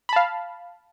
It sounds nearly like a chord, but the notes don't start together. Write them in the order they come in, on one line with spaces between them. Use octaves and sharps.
B5 A5 F5